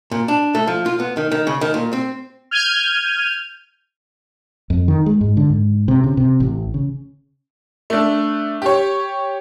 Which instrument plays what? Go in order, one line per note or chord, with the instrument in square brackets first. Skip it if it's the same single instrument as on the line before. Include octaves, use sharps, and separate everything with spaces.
[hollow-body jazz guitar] A#2
D4
A3
F3
F4
B3
D#3
D#3
C#3
D#3
A#2
C4
[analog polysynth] F6 G6 G#6 D#7
[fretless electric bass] F2
D#3
G#3
G#2
D3
G#2
C3
C#3
C3
A1
C#3
[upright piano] A3 D4
G4 C#5